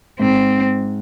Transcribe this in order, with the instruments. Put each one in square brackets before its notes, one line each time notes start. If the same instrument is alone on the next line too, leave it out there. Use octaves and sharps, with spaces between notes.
[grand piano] G#2 [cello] C4